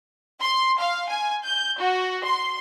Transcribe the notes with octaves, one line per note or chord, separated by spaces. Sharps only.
C6
F5
G#5
G6
F#4
C6